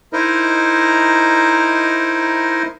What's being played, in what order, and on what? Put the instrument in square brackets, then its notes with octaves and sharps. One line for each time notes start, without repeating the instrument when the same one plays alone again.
[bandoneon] D#4 E4 A#4 C5 D#5